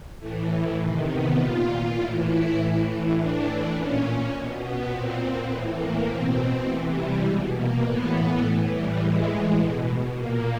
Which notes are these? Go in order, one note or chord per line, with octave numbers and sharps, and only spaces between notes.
A2 E3 A3
C3 D#3
B3
A#2 F4
A2 E3 E4
E4
A2 E3
A2 E3 D4
A#2 C#4
B2
B3
A#2 C4
A2 E3 B3
A#3
B2 C4
C3 E3 A3
G3
B2 G#3
A#3
A2 E3 B3
A2 E3 A3
G3
A2 E3 G#3
B2
A#2 A#3